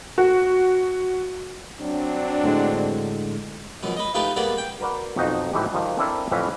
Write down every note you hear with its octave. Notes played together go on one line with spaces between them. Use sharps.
F#4
F#3 C4 D4
A2 D3 G#3
A#1 F#2 B2
B4 D#5
A3 D#4 F4 G4 B4
G3 A#3 B3 G#4 B4 D5
G5
F#4 A#4 B4 D5 F#5
B1 F2 D#4 F#4
G#1 A2 E3 F#3 G#3 G4
D#3 F3 G3 D4
C4 D4 E4 A4 A#4 C5
F2 A2 E3 F#3 C#4 B4